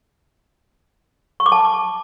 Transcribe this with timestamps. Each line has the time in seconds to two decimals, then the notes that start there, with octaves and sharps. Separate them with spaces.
1.40 C#6
1.46 D6
1.52 A5